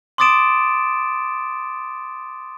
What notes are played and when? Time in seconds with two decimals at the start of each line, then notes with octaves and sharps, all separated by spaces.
0.18 C6 D6 D#6 A6 D7 E7